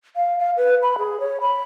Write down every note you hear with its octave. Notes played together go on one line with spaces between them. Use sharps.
F5
F5
B4
B5
G#4
C#5
B5